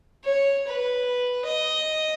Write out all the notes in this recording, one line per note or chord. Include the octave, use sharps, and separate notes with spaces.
C#5
B4
D#5